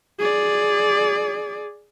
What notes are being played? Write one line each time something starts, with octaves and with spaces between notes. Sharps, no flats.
G#4 D5